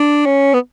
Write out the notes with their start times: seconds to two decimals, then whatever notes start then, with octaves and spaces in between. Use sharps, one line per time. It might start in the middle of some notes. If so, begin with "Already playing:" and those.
Already playing: D4
0.26 C#4
0.54 B3